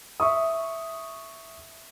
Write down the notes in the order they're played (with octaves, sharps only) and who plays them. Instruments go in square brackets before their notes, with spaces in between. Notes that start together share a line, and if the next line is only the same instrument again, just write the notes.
[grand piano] E5 C#6 D#6